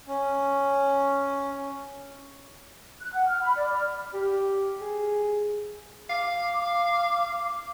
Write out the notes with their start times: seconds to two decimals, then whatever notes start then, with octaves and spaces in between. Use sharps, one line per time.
0.08 C#4
3.01 F#6
3.13 F#5
3.27 F6
3.43 B5
3.57 D5
3.72 F6
4.14 G4
4.81 G#4
6.10 F5 D6